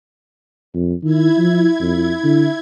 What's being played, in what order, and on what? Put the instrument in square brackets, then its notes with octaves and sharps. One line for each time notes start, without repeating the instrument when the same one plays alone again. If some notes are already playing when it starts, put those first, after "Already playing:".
[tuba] F2
[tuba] D#3 [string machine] E4 G#6
[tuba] F3
F2
D3